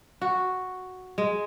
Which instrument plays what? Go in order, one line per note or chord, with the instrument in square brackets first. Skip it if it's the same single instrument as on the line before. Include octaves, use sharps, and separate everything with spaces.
[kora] F#4
G#3